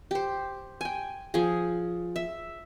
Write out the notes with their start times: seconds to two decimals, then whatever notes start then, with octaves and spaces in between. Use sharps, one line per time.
0.11 G4 C5
0.81 G5 G#5
1.34 F3 G#4
2.16 E5